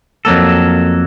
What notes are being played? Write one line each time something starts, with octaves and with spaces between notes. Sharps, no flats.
F2 F#3 A#3 A4